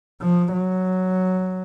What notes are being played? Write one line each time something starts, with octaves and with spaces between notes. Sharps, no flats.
F3
F#3